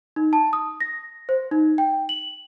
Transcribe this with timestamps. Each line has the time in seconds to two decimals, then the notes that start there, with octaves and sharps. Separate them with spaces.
0.16 D#4
0.33 A5
0.53 D#6
0.80 A#6
1.29 C5
1.51 D#4
1.78 G5
2.09 F#7